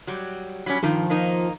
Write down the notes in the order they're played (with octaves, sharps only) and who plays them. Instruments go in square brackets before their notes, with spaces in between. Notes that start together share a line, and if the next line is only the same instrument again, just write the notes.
[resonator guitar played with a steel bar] F#3 G3
[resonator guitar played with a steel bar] F#3 G3 C#4 [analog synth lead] B5
[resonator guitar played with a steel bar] G2 D#3 [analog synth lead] F3
[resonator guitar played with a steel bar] D#3 A#3 D#4